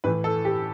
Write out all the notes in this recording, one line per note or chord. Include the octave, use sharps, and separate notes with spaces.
A2 E3 B4
A4
G4